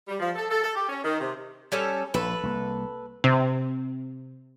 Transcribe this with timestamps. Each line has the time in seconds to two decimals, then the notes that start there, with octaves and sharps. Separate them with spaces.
0.08 G3
0.20 F3
0.36 A4
0.50 A4
0.62 A4
0.75 G4
0.89 C#4
1.03 D#3
1.21 C3
1.72 G3 C#4 A4
2.14 A#1 A4 B4
2.43 C2 A#3
3.24 C3